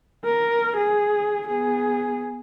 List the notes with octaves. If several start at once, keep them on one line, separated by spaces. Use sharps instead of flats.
A#4
G#4
B3 G#4